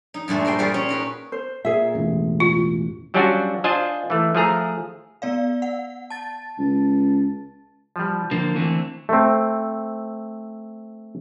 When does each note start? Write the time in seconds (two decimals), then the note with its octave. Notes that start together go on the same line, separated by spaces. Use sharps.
0.14 D#4
0.28 G2 A#2 G#3 A3
0.45 A#4 C5 D#5 G5
0.59 G3 F4 F#4 G#4 A#4 F5
0.74 C#4
0.89 D#4 A#4 B4
1.32 C5
1.65 A#2 G#4 E5
1.95 E1 A1
2.40 F4
3.14 F#3 G3 C#4 D4 F4 F#4
3.64 D4 F4 C5 D#5 G#5
4.10 E3 A3
4.35 F3 A3 G#4 A#5
5.22 B3 D5 F5
5.62 F#5
6.10 A5 A6
6.58 C#2
7.96 F3 G3
8.31 D3 F3 A#3 C5
8.56 D3 E3 A3 C4
9.09 A3 C4